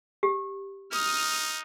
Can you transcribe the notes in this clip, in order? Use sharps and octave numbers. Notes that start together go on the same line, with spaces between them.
G4
D#4 D#6 F6